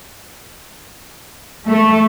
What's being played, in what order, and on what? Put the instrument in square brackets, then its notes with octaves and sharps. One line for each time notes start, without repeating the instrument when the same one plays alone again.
[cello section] A3